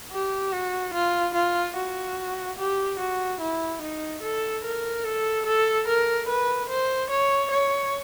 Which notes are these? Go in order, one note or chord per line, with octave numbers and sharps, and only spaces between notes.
G4
F#4
F4
F4
F#4
G4
F#4
E4
D#4
A4
A#4
A4
A4
A#4
B4
C5
C#5
C#5